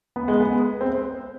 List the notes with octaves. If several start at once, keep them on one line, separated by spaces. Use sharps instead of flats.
B3
G#3
B3
C4